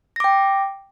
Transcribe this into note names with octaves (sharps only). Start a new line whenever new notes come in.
G5 D6 A#6